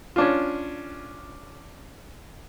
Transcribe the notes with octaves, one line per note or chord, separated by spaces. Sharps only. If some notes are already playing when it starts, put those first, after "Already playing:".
C#4 D4 F4